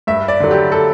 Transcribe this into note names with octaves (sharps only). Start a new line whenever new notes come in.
G2 E5
D5
D3 F#3
G4
A4